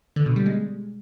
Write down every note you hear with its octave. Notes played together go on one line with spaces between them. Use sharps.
D3
B2
G3
G#3